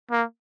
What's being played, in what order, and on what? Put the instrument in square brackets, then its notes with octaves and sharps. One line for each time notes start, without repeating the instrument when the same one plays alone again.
[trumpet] A#3